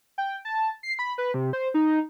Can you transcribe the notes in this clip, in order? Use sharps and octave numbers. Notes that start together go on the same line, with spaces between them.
G5
A5
C7
B5
B4
C3
C5
D#4